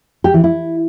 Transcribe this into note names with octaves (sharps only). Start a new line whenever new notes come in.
G4
E3
E4